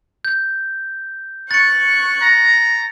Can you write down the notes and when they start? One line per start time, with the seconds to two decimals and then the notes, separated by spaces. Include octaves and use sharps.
0.25 G6
1.51 C#6 F#6 A6 C#7
2.22 A#5